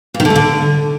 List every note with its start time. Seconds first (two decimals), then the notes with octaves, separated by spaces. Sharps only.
0.14 A#2
0.20 D#3
0.25 D3
0.30 A3
0.36 D3